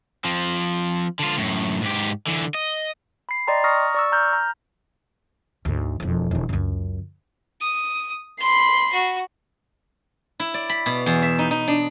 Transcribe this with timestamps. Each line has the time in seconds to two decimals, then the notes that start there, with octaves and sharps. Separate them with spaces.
0.25 F3 C4
1.19 D3 F4
1.38 F#2 A2
1.82 G#2 G4
2.27 D3 E3
2.54 D#5
3.29 B5 C7
3.47 D5 D#5 G5 A#5 C6
3.64 A#5 C#6 D#6 F6 A#6
3.94 D5 C#6 E6
4.12 A#5 F6 G6
4.33 A#5
5.65 D2 G#2
6.00 E1 F2
6.31 E1 D3
6.49 C#2 F#2
7.60 D#6
8.40 B5 C6 C7
8.93 F#4
10.40 E4
10.54 D5
10.69 B5
10.86 B2
11.06 E2
11.22 E5
11.39 D#4
11.51 D#4
11.68 D4